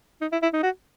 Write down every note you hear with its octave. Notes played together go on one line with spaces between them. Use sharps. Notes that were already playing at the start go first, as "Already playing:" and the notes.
D#4
E4
E4
D#4
F#4